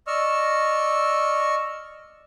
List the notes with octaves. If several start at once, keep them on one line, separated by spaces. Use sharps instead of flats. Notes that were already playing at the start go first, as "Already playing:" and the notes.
D5 D#5 C#6 E6 F6